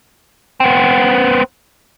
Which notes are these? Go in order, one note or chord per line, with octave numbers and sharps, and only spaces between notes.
B3 C4